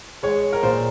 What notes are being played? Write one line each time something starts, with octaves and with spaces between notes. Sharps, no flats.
G#3 C#5
A#4
A#2 C5